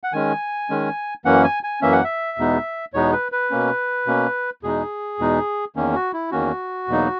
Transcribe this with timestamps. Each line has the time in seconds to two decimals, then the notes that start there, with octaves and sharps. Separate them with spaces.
0.04 F#5
0.13 D#3 G#3 C#4 G#5
0.70 D#3 G#3 C#4
1.25 F#2 E3 A#3 C#4 F#5
1.44 G#5
1.63 G#5
1.81 F#2 E3 A#3 C#4 E5
1.92 F#5
2.04 E5
2.38 E2 B2 G#3 B3 D#4
2.94 E2 B2 G#3 B3 D#4 C#5
3.13 B4
3.32 B4
3.51 B2 A#3 C#4
4.07 B2 A#3 C#4
4.63 E2 B2 G#3 D#4 G#4
5.19 E2 B2 G#3 D#4
5.76 E2 D#3 A#3 C#4
5.95 F#4
6.13 E4
6.31 E2 D#3 A#3 C#4 F#4
6.88 E2 B2 F#3 A#3 D#4